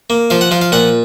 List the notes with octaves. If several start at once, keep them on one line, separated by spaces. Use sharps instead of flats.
A#3
F3 F5
F#5
F3 F5
F5
A#2 F#5